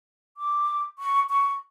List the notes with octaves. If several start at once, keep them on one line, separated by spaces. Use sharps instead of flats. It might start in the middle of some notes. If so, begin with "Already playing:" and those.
D6
C#6
C#6